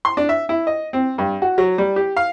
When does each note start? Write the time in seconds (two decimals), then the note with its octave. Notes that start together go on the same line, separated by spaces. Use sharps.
0.05 C6
0.17 D4
0.29 E5
0.49 E4
0.67 D#5
0.93 C4
1.18 G2
1.42 F#4
1.58 F#3
1.78 G3
1.96 G4
2.17 F5